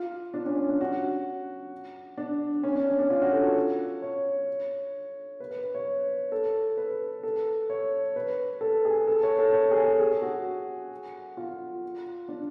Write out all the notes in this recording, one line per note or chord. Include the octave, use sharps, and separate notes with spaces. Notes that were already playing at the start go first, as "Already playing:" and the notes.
Already playing: F4
D4
C#4
C#4
D4
F#4
D4
C#4
D4
C#4
D4
F4
F#4
A4
C#5
C#5
B4
B4
C#5
A4
B4
A4
C#5
B4
A4
G#4
A4
C#5
A4
C#5
G#4
A4
G#4
F#4
F4
D4